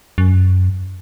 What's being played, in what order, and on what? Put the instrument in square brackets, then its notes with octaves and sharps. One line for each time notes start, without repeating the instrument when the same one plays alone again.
[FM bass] F#2